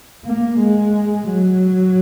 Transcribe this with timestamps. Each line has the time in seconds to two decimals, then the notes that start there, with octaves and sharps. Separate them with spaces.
0.25 A#3
0.59 G#3
1.27 F#3